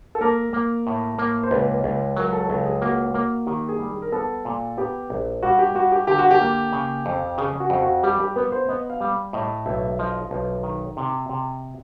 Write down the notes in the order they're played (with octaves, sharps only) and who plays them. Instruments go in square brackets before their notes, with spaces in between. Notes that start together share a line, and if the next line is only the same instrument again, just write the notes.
[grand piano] A4
[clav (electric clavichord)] A#3 [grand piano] A#4
[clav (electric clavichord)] A#3
A2
A#3
[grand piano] C5
[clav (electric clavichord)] C#2 [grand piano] B4
[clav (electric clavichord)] C#2
[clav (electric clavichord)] F#3 [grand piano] A#4
[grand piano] A4
[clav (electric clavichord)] C#2 [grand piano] A4
[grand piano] G#4
[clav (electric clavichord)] A#3 [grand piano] F#4
[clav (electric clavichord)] A#3
[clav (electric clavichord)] D#3 [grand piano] G4
[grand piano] G#4
[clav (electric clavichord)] G3
[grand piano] G#4
A#4
[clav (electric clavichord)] B3 [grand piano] A4
[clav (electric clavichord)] A#2
[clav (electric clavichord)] B3 [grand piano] G4
[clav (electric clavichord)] A#1
[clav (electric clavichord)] G3 [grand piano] F#4
[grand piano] G4
[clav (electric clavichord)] G3 [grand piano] F#4
[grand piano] G4
[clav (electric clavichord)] D3 [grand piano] G4
[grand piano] F#4
G4
[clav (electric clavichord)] A#3
C#3
F2
[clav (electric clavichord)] C#3 [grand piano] G#4
[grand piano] F#4
[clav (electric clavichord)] F2
[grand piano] F#4
[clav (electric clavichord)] G3 [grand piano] G4
[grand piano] G4
[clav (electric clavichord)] B3 [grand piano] B4
[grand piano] C5
[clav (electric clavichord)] B3 [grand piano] D#5
[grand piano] F5
[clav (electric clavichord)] G3
[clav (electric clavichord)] A2 [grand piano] D#5
[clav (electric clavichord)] B1 [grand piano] E5
[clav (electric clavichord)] F3 [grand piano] D#5
[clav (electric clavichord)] B1
D#3
C3
C3